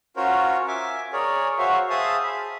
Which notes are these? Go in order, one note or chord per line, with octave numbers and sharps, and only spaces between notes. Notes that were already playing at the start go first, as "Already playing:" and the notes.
C#4 F4 F#4 A#4 C5 C#5
E5 G#5 D6
G#4 A#4 C#5 D5
F#4 C5 C#5 E5 F5
G#4 C5 E5 F5 A5 D#6
B5